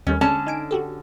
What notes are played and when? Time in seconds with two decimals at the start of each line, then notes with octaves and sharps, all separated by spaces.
0.07 D#2 G3 A3 C#4
0.21 D3 G#3 C#4 A5
0.47 D#4 G#5 D7
0.71 F#4 G4 A4